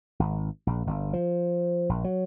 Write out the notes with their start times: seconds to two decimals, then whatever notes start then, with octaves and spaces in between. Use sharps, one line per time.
0.19 G#1
0.67 A#1
0.87 G1
1.13 F3
1.89 A#1
2.04 F#3